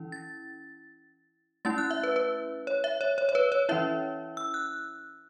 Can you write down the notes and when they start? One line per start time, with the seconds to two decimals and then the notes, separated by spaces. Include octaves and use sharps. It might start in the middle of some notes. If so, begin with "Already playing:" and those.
Already playing: E3 C#4 E4
0.12 A6
1.65 A3 C#4 E4 A6
1.78 F#6
1.91 E5
2.04 B4
2.16 B4
2.67 C#5
2.84 E5
3.01 C#5
3.18 C#5
3.29 C#5
3.35 B4
3.52 C#5
3.69 E3 C#4 E4 E5
4.37 E6
4.54 F#6